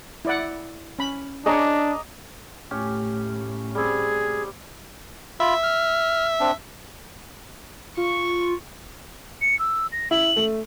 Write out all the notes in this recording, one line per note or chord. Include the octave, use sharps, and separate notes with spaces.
E4 D5 F#5
C#4 B5
D4 G#4 C#5 D#5 A#5 D6
A2 C#4 G4
G3 C4 G#4
F4 E5 B5
F6
C4 D4
F4 C#6
C#7
E6
A#6
E4 F#7
A3